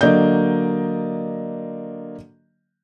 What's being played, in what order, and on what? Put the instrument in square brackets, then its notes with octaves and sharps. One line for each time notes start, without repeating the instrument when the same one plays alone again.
[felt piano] D3 F#3 A#3 D5 D#5 G6